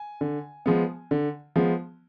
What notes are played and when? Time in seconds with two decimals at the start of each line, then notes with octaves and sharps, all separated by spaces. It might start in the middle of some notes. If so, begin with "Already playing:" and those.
Already playing: G#5
0.21 D3
0.66 F3 G#3 B3
1.11 D3
1.56 F3 G#3 B3